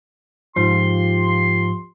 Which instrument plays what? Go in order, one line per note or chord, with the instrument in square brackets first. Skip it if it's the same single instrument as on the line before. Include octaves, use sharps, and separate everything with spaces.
[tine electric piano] G#2 F3 [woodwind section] F4 G4 C6